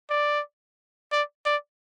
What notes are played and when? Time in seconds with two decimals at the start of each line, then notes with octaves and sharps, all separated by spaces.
0.10 D5
1.12 D5
1.46 D5